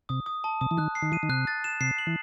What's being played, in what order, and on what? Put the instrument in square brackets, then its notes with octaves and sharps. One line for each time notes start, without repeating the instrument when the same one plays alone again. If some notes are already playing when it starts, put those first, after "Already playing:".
[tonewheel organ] C3 [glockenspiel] D#6
[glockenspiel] D#6
A5
[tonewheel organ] C3 [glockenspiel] D#6
[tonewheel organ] E3
[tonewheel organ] D#3 [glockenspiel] F#6
[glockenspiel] C7
[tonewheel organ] D#3
[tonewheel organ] E3 [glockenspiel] D#7
[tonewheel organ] D#3
[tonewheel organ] C3 [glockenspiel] F#6
[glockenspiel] A6
E7
[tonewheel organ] C3 [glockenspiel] C7
[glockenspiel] F#7
[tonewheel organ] E3